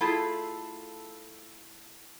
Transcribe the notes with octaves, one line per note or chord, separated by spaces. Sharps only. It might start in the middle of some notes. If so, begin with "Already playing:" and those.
A3 E4 F4 G#4 A4